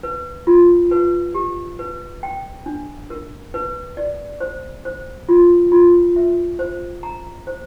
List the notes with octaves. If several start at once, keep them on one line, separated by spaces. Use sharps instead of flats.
B4
F4
B4
G4
B4
G5
D4
A#4
B4
D5
C5
C5
F4
F4
E5
C5
A#5
C5